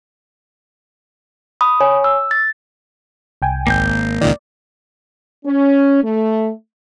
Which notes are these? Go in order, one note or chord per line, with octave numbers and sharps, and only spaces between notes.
B5 D#6
C#5 G#5
E6
A6
C2 G5 G#5
G#1 A#3 G6
C#2 A#2 D#3 D5
C#4
A3